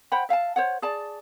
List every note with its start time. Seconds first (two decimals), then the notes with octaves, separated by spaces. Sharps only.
0.12 C5 F#5 G5 B5
0.29 E5 F5 G5 A5
0.56 C5 C#5 F#5
0.82 G#4 D5 A5